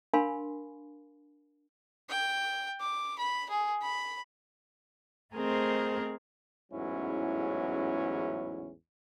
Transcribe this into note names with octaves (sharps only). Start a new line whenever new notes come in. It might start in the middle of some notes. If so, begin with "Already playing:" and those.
D4 A#4 F5 G#5 B5 C6
G5
D6
B5
G#4
B5
A3 C4 G#4 A#4 C5 D#5
A1 E2 G#2 F#3 C#4 E4